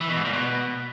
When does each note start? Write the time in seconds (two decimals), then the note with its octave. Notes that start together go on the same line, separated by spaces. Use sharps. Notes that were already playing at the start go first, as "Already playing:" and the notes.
0.01 E3
0.09 B2
0.17 G#2
0.25 A#2
0.33 B2